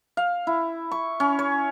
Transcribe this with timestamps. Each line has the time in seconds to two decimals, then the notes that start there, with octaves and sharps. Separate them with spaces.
0.17 F5
0.47 E4
0.91 C#6
1.20 C#4
1.39 C#5